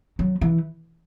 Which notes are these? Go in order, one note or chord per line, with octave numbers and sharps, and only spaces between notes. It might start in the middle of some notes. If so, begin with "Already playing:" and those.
F#3
E3